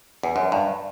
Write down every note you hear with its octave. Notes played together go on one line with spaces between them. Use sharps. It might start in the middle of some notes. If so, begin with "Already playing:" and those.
E2
F#2
G2